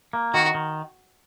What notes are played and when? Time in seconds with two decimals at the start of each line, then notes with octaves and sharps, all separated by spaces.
0.13 A#3
0.34 D#3 F#4
0.54 D#3